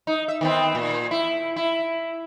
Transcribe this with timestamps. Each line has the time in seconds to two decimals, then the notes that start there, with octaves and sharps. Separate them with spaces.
0.07 D#4
0.28 E5
0.41 D#3 B3 C4
0.75 A#2
1.11 E4
1.56 E4